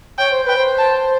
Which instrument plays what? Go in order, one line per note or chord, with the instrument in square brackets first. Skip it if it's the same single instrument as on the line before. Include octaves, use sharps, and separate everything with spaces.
[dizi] C#5 [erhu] G5
[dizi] C5
[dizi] B4 [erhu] G5
[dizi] C5
[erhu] A5